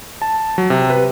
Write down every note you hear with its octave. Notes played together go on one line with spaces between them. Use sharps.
A5
F#3
C3
B4